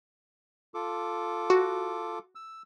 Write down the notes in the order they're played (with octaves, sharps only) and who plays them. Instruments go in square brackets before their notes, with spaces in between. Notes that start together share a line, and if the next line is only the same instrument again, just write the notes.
[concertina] F4 A4 D6
[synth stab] F#4
[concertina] E6